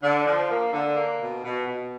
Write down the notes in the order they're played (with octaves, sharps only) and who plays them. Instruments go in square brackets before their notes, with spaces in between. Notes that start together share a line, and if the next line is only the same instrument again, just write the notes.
[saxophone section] D3
F3
A#3
D3
A#3
B2
B2
B2